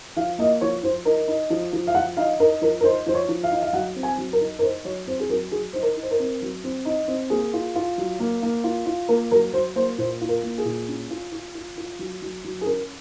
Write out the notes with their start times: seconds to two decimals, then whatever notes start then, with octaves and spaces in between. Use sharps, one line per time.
0.17 F3 F5
0.38 A#3 D#5
0.61 F3 C#5
0.83 F3 C5
1.05 D#4 A#4
1.28 D#4
1.50 F3
1.73 F3
1.87 F5
1.94 F3 F#5
2.17 D#4 F5
2.40 D#4 A#4
2.61 F3 A#4
2.81 A#4
2.84 D#4 C5
3.06 F3 C5
3.14 C#5
3.29 F3
3.44 F5
3.51 D#4
3.62 F5
3.73 F#3 F#5
3.96 C4
4.03 G#5
4.18 F#3
4.33 A#4
4.40 D#4
4.59 A#4
4.62 D#4 C5
4.85 F#3 C#5
5.07 C4 C5
5.20 G#4
5.29 F#3 A#4
5.52 F#3 G#4
5.73 D#4 C5
5.82 A#4
5.96 D#4
6.03 C5
6.11 A#4
6.19 C4
6.42 F#3
6.64 C4
6.85 D#4
7.08 C4
7.30 A#3 G#4
7.54 F4
7.76 F4
7.98 F#3
8.20 A#3
8.43 A#3
8.64 F4
8.86 F4
9.09 A#3 A#4
9.31 F#3 A#4
9.53 F#3 C5
9.75 A#3 C5
9.98 A#2 C5
10.21 F4
10.29 A#4
10.43 A#3
10.58 G#4
10.65 A#2
10.88 C#4
11.10 F4
11.32 F4
11.55 F4
11.77 F4
11.99 F#3
12.22 F#3
12.44 F#3
12.61 G#4
12.66 C#4 A#4